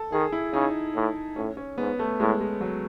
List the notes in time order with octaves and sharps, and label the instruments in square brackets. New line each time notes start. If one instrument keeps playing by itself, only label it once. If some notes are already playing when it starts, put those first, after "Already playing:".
Already playing: [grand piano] A4
[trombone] D#3 [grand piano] G#4
[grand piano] E4
[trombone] C#3 [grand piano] D#4
[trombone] A2
[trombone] A2 [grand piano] C#4
[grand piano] C#4
[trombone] G#2 [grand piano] B3
[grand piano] A3
[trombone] A2 [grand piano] G#3
[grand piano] G#3
F#3